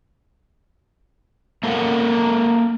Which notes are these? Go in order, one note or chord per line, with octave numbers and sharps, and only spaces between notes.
A#3 A4 A#4 E5 F#5